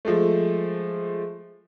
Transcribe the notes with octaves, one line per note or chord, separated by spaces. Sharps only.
F3 G#3 A3